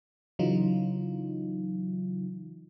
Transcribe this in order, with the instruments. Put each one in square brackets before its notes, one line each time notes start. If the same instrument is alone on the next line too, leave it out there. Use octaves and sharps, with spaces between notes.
[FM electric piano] C#3 E3 F#3 D#4 F4